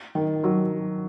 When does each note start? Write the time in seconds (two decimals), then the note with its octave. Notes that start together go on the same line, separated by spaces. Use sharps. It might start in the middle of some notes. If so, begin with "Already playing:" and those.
0.15 D#3
0.44 F#3